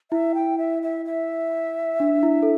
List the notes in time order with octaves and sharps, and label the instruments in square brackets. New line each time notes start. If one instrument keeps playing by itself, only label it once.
[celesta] E4 [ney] E5
[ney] G5
E5
E5
E5
[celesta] D4
E4
A4